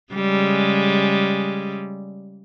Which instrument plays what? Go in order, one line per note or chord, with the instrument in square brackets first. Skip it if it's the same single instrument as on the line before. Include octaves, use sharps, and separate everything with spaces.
[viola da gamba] C#3 G3 G#3